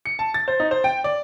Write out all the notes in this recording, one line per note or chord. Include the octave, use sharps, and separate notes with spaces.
C#7
A5
A6
C5
D#4
C5
G5
D5